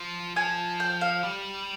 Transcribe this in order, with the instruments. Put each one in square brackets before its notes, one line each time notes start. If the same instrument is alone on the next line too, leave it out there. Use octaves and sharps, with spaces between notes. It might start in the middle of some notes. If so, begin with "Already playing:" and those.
Already playing: [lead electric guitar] F3
[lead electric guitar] F3 [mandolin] G#5
[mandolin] G5
F5
[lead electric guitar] G3